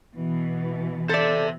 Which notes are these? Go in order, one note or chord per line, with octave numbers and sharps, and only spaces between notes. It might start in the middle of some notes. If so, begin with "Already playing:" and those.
B2 E3
A4 C5 D5 E5